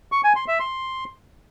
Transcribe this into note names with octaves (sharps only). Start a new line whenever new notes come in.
C#6
G#5
C6
E5
C6